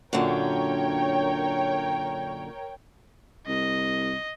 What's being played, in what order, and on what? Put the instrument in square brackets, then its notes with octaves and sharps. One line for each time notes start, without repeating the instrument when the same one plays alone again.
[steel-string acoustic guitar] F#2 A#2 D3 [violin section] A#4 C#5 G5
[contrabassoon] C2 [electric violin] D#5